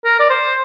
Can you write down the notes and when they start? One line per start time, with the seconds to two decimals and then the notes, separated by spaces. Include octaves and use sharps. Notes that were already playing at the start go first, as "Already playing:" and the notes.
0.05 A#4
0.20 D5
0.30 C5